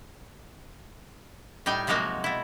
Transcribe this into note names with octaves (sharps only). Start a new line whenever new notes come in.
A2 G3 D#4 G5 G#5
C3 F3 F#3 G#3 A#3 F#4
B2 E4